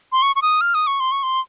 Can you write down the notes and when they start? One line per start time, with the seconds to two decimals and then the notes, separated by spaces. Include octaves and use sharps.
0.12 C6
0.22 C#6
0.36 C#6
0.42 D#6
0.61 F6
0.75 D#6
0.87 C#6
1.00 C6
1.12 C#6
1.23 C6